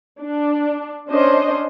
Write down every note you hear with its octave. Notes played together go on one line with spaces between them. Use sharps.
D4
C#4 D4 C5 D#5